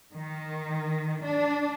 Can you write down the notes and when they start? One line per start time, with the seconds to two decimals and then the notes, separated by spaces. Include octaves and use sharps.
0.12 D#3
1.22 D4